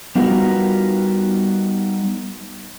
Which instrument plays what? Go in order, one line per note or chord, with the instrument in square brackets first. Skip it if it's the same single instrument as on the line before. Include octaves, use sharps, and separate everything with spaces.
[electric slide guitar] G3 B3 D#4 F4 F#4 A#4